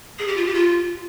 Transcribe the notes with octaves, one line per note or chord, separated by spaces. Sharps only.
G#4
G4
F4
G4
F4